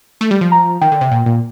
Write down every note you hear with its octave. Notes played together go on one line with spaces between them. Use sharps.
A3
G3
F3
A#5
D#3 G5
D3
C3
A#2
A#2